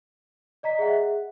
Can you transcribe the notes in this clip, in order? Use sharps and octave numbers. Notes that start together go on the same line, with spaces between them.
D5 D#5 A#5 B6
G#4 E5 F#5